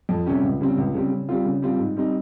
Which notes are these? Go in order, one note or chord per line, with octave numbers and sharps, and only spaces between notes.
F2
C3 G3 C#4 G4
C#2
C#3 G3 C4
C#2
C#3 G3 C4
C#3
G3 C4 F4
C#3
G3 C4 F4
G#2
G3 C4 D#4